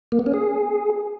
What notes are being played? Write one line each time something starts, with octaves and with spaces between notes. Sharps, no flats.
A#3
B3
C#4
G#4